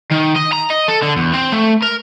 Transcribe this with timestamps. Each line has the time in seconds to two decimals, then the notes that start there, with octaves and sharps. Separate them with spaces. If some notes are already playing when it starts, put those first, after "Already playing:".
0.12 D#3
0.36 D#5
0.53 A#5
0.70 D#5
0.88 A4
1.03 D3
1.17 E2
1.34 C4
1.52 A3
1.82 A#4